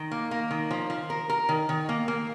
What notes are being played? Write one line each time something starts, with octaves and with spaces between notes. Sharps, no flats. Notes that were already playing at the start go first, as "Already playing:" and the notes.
Already playing: D#3
A#3
A#3
D#3
F3
F3
A#4
A#4
D#3
D#3
A#3
A#3